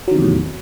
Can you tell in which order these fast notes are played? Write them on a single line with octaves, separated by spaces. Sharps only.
F#3 D#3 C3 E2 A2